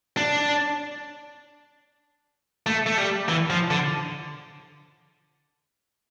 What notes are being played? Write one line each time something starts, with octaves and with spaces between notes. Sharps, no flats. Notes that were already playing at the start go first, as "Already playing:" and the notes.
D4
A3
A3
G3
E3
F3
D3